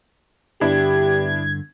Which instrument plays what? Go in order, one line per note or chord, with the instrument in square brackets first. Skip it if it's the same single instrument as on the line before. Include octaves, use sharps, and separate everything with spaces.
[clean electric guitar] G2 D3 [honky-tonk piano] B3 D4 E4 [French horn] G4 [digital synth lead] G#6